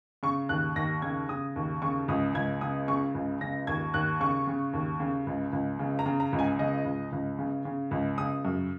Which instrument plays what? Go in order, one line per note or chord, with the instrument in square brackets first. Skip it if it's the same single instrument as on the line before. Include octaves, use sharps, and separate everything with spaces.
[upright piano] C#3 C#6
D#2 F#6
D#2 A#6
C#3 G#6
C#3 D#6
D#2
C#3 C#6
C#2 D#6
C#2 G#6
C#3 D#6
C#3 C#6
C#2
C#3 A#6
D#2 G#6
D#2 F#6
C#3 C#6
C#3
D#2
C#3
C#2
C#2
C#3
A#5
C#3
A#5
C#2
G#5
C#3 D#5
C#2
C#2
C#3
C#3
C#2
C#3 D#6
F#2